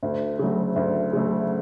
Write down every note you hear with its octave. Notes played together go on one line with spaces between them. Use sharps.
D2
C#3 F#3 A3
D2
C#3 F#3 A3